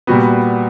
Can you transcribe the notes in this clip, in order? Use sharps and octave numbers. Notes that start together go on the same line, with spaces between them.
A#2 G3 B3 F#4